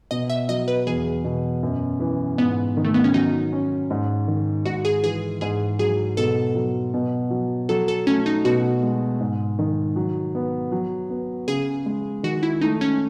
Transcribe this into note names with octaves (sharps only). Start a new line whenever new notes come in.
B2 D#5
E5
F#3 D#5
B4
E2 G#4
B2
F#2
E3
G#2 B3
D#3
A3
B3
C#4
F#3 D#4
C#4
G#2
D#3
G#2 F#4
G#4
E3 G#4
G#2 G#4
F#3 G#4
B2 A4
F#3
B2
F#3
F#3 A4
A4
A3 C#4
D#4
B2 F#4
G#3
G#2
D#3
F#3
B3
F#3
B3
C#3 G#4
G#3
D#3 F#4
E4
A3 D#4
C#4